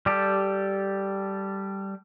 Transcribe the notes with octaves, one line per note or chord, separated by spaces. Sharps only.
G3 G4 A4